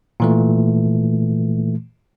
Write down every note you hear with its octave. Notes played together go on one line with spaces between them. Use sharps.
A#2 E3 A3